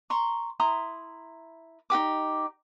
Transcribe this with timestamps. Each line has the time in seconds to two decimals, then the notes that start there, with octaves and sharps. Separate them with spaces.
0.10 A#5 C6 C#6
0.60 E4 A#5 C6 D#6
1.90 D#4 F#4 G4 D6